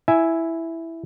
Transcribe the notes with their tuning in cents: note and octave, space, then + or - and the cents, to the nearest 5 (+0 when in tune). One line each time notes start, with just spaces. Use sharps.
E4 +0 E5 +0 G#5 +0